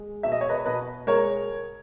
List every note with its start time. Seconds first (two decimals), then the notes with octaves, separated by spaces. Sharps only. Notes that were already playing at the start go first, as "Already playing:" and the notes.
Already playing: G#3
0.23 B2 E5
0.32 D#5
0.41 C#5
0.49 B4 D#5
0.66 B2 B4 D#5
1.07 G#3 A#4 C#5